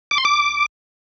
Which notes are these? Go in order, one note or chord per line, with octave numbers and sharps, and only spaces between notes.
D6
C6
D6